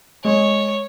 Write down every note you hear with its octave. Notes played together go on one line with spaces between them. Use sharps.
G#3 C#5